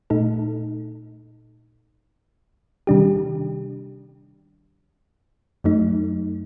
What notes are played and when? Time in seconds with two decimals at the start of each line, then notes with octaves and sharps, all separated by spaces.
0.10 A#2 A3 D#4 A4
2.87 C3 D#3 G3 D4 G4
5.64 F#2 F#3 A3 D#4